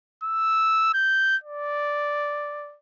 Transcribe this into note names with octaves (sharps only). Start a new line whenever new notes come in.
E6
G6
D5